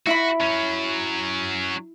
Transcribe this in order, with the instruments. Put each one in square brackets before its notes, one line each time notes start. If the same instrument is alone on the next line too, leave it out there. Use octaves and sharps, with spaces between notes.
[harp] E4 E5 B5 [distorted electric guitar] F#4
[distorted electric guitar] F#3 C#4